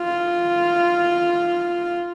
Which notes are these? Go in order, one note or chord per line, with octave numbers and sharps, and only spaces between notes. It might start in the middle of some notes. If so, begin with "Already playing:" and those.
Already playing: F4